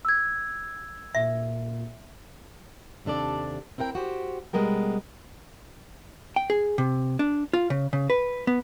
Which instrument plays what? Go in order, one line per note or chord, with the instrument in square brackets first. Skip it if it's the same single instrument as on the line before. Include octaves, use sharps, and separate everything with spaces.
[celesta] E6 G#6
[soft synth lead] A#2 [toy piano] E5
[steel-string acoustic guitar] D#2 C3 D4 A4 D5
C4 E4 A#4 F#5 G5
F#4 G4 C5
B2 G3 G#3 B3 A#4 G5
[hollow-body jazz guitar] G5
G#4
C3
D4
F4
C#3
C#3
B4
B3